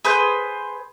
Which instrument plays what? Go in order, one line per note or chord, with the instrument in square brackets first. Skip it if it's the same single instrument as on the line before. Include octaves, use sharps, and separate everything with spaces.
[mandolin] G#4 B4 C5 G6